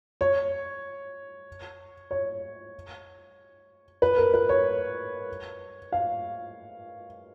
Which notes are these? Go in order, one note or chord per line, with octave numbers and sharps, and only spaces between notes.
C#5
C#5
B4
A#4
B4
C#5
F5